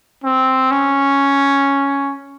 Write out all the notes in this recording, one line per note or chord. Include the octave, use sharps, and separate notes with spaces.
C4
C#4